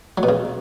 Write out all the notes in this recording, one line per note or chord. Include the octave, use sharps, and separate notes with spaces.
F#3
B2
C#3